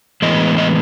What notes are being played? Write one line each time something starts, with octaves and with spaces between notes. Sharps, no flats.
A2 E3 G#3 B3 D#5
D#5